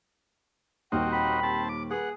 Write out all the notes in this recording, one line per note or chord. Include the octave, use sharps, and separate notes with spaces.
D#1 D#2 C4 D#4 F#4 G5 F6
G5 B5
C4 A5
D6
G#4 B4 F#5